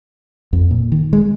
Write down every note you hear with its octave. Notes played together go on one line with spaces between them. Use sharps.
F2
A#2
D#3
G#3